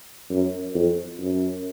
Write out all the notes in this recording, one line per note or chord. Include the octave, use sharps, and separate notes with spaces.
F#2
F2
F#2